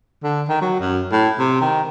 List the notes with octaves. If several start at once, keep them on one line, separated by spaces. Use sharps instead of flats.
D3
D#3
F#3
F#2
A2
C3
D#3